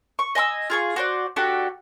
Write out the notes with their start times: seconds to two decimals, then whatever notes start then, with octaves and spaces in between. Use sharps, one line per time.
0.19 C#6
0.35 D#5 G#5 B5 E6
0.70 F4 G#4 C#6
0.96 F#4 C5 D5
1.36 D4 F#4 G4 A4